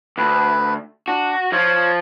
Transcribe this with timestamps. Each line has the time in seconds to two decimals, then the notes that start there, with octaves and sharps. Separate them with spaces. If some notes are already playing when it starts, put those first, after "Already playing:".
0.18 D2 B4
1.08 D4 F#4
1.52 F3 F4 C#5